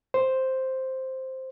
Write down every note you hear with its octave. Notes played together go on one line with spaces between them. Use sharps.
C5